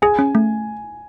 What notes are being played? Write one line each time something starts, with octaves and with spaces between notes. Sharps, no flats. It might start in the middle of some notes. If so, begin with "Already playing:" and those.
G#4 G#5
C#4
A3